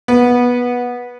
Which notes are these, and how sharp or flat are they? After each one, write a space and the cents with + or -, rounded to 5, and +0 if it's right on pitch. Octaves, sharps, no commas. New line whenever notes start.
B3 -15